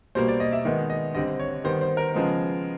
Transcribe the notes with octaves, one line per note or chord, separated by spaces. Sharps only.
B2 G3 A#3 C5
D5
D#5
E5
D#3 G#3 B3
D#5
D3 G3 C4 D#5
C#5
D#3 G3 B3 C5
C5
A#4
C#3 F3 G#3 B3